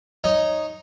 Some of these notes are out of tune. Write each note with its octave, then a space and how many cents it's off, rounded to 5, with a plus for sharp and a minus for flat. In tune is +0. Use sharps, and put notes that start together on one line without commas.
D#4 +0 C#5 +0